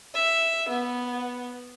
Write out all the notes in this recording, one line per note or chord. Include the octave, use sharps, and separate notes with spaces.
E5
B3